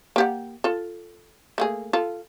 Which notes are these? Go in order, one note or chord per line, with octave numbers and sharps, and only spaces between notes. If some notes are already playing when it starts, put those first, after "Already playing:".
A#3 G4 F#5
F4 A4
A3 A#3 G#4
F4 A4